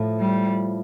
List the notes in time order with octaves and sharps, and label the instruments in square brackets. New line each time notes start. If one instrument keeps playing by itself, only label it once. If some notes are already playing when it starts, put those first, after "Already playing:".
Already playing: [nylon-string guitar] A2 F3 A3
[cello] G3